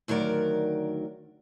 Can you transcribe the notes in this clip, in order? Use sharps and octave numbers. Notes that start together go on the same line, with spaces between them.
D2 D#3 F#3 A#4 D5